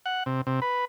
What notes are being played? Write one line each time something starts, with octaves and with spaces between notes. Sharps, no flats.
F#5
C3
C3
B4